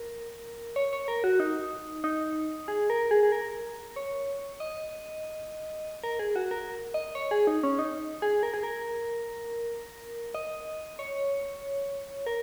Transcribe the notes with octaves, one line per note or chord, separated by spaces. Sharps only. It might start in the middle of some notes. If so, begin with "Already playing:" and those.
Already playing: A#4
C#5
C#5
A#4
F#4
D#4
D#4
G#4
A#4
G#4
G#4
A#4
C#5
D#5
A#4
G#4
F#4
A#4
D#5
C#5
G#4
D#4
C#4
D#4
G#4
A#4
G#4
A#4
D#5
C#5
A#4